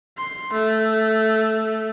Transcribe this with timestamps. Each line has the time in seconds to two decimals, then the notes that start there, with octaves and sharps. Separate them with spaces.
0.18 C6
0.53 A3